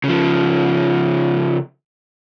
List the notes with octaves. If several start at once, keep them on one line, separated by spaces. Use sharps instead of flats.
C#3 F3